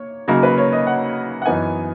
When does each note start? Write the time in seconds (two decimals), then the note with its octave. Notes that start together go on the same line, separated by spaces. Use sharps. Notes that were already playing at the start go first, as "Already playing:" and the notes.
Already playing: A#3 C#5
0.28 C#3 F#3 A#3 D#4 A#4
0.43 B4
0.58 C#5
0.72 D#5
0.87 F#5
1.42 F#5
1.46 F#2 E3 B3 D#4 G#5